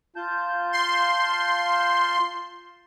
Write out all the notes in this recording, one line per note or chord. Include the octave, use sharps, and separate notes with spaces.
F4 A5 G6
C6